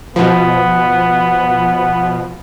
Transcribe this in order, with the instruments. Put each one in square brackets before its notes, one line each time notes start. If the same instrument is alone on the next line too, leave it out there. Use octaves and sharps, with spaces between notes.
[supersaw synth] B2 F3 [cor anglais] B3